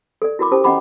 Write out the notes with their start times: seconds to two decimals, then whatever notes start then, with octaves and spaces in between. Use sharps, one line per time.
0.22 A4 D5
0.39 E4 F#4 A#4 B5 D6
0.51 C#4 G4 C5 A5 D#6
0.64 C#4 D#5 F#5 A#5 B5 D6